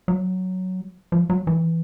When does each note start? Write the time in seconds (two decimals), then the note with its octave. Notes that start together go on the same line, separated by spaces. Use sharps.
0.08 F#3
1.12 F3
1.30 F#3
1.47 E3